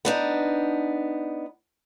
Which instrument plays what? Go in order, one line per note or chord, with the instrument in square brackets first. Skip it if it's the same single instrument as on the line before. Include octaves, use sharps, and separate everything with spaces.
[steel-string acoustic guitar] B3 D4 D#4